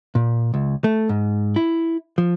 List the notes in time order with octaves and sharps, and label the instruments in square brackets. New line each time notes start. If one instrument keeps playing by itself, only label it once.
[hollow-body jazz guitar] A#2
C#2
A3
G#2
E4
F3